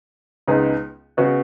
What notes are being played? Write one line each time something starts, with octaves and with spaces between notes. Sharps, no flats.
C#2 C#3 G#3 B3 D#4
C#3 B3 F#4 D#5